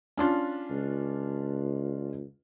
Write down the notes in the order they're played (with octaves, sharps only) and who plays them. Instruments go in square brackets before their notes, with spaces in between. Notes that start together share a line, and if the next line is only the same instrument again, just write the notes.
[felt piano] C#4 D4 F4
[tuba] C#2